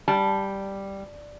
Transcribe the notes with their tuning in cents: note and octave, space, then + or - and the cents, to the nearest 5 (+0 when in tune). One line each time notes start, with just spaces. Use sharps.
G3 +0 A5 +0